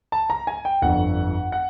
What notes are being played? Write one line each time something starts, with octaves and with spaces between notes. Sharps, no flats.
A5
A#5
G#5
G5
G1 F2 D3 F#5
F#5